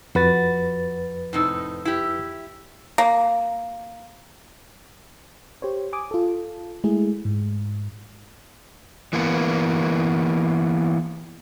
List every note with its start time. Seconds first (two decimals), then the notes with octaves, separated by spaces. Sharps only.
0.15 F2 F#4 B4 A6
1.33 A2 C3 D#4
1.85 E4 G4
2.98 A#3
5.62 G4 C5 C#5
5.93 G#5 D6 D#6
6.11 F4 A4
6.84 G#3 A3 E4 G#4
7.25 G#2
9.13 E3 A#3 B3